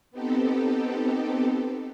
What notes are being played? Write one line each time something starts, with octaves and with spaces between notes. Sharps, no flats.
B3 C4 D#4 G4 A4